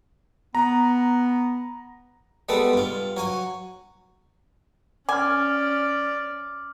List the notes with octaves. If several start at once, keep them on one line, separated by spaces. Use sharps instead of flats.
B3 A#5
G3 G#3 B3 A4
G2 F4
F#3 C#5 G#5
C#4 D5 G#5 D6 F6